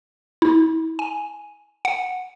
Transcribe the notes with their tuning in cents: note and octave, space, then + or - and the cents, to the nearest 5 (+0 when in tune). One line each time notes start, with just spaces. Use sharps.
E4 -35
G#5 +0
F#5 -10